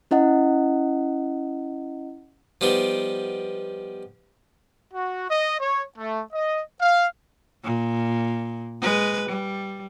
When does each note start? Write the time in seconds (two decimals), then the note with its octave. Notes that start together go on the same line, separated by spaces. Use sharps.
0.11 C#4 E4 D#5 F#5
2.61 F3 G3 B3 D#4 G4
4.92 F#4
5.29 D#5
5.58 C#5
5.96 A3
6.32 D#5
6.81 F5
7.64 A#2
8.82 G#3 B4
9.29 G3